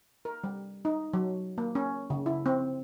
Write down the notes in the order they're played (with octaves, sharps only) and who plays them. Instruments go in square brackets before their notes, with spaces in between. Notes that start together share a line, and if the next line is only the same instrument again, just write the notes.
[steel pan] A#4
G3
D#4
F#3
A#3
C#4
C#3
E4
C4